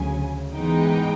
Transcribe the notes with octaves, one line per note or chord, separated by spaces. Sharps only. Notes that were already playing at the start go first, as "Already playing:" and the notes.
Already playing: D2 C#3 F#3 G#5
G#2 E3 G#3 B3 D#4 G5